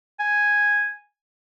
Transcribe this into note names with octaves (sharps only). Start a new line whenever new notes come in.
G#5